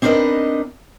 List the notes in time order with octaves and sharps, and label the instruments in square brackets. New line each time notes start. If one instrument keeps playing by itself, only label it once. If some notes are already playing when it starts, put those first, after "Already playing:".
[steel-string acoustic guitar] C4 D4 D#4 A#4 B4 D#5